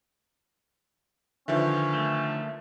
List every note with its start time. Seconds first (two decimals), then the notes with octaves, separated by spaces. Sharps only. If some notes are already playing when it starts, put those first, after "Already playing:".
1.48 D3 D#3 F3 C#4 B4 E5
1.94 A3